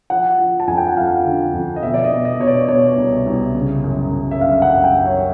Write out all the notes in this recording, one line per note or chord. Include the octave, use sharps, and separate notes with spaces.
F3 F#5
F3
A5
F2 G#5
G5
F#5
F2 F5
D3
F2
D#5
B2 E5
D5
D#5
B2
D#5
B2 C#5
D5
B2 C#5
C2
C2
C#3
F#2
F#2
E5
F#2 F5
F#5
F#2
G5
F#2
C#5